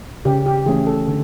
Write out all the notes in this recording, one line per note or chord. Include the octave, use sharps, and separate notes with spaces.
C#3 G4
G4
E3 A3 C#4 G#4
A4
D3